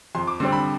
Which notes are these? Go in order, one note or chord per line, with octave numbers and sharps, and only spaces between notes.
F2 C6
D6
D3 G3 C4 C6
B5